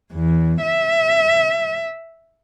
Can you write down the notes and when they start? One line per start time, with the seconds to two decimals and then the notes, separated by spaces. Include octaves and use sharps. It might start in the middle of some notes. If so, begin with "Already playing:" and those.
0.13 E2
0.63 E5